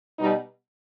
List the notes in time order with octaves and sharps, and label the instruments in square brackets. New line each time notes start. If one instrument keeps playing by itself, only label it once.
[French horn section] B2 G3 D#4